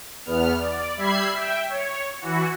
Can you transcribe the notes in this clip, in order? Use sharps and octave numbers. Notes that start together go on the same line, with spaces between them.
E2 B3 F6
D5
G3 E5 B5 G#6 C7
E5 G5
C#5
E3 F#4